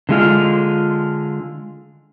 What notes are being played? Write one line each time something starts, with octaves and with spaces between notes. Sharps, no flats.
D3 G#3 F4